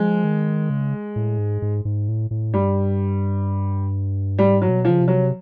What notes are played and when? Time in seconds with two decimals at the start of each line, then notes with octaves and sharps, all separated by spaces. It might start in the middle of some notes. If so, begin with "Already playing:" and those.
Already playing: F3 G#3
0.24 D#3
0.70 C#3
1.16 A2
1.38 G#2
1.62 G#2
1.85 G#2
2.08 A2
2.31 A2
2.54 G2 G3
4.38 G#2 G3
4.62 F#3
4.69 B2
4.85 F3
4.90 C#3
5.00 C3
5.08 F#3